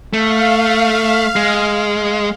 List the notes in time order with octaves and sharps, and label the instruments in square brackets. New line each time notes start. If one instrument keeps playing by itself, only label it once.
[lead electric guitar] A3 [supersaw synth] F5
[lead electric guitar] G#3